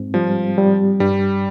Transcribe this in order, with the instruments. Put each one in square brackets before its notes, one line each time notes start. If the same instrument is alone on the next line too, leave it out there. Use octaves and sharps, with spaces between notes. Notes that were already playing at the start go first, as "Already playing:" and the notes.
Already playing: [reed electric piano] G#2 C4
[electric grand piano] F3 [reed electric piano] G3
[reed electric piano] G3
[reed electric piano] G2 [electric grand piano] G3